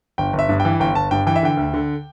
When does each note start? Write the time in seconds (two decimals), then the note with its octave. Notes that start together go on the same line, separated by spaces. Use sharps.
0.18 G1 G5
0.33 G1
0.39 E5
0.49 G2
0.60 G5
0.65 E3
0.80 G1 G5
0.95 G1 A5
1.11 G2 G5
1.27 E3 G5
1.36 E5
1.43 D3 G5
1.57 D2
1.74 D3